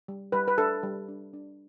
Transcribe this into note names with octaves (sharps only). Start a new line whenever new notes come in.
G3
G3 B4
B4
D4 A4
G3
D4
D4